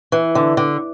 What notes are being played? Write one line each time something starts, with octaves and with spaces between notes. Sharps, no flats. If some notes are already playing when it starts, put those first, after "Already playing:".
E3
D3
D3